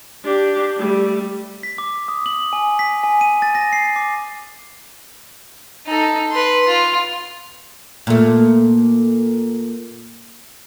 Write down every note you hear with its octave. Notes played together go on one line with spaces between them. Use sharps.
D4 G4
G3 A3
B6
D6
D#6
F#7
G#5
B6
G#5
D#7
A6
A#6
C7
D6
D#4 A4
B4 C6
F4
A#2 A3